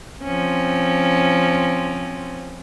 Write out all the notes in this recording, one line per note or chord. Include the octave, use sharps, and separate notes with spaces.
F3 C4 C#4